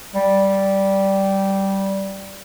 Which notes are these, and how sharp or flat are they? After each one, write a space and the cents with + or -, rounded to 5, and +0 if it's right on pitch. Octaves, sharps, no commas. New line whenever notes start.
G3 -10